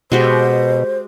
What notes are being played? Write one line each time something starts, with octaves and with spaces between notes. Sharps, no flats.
B2 G#3 F#4 G4 C5